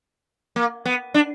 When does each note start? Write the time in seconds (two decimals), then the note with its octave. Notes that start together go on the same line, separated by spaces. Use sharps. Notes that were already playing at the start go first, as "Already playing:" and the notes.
0.56 A#3
0.85 B3
1.14 D4